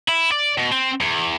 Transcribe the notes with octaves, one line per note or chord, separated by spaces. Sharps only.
E4
D5
B2
C4
E2